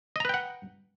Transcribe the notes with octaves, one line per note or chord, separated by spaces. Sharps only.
B4 D#5 F#5 G5 A#5